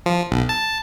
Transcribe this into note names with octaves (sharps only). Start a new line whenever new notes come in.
F3
B1
A5